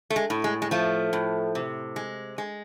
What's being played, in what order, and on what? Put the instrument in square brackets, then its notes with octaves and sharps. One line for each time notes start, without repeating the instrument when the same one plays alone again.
[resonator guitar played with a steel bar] A3
G#3
A2
G#3
G#3
F3 A3
A2
C3
G#3
G#3